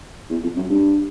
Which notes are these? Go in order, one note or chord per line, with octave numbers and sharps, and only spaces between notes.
E2
F2
F#2
G2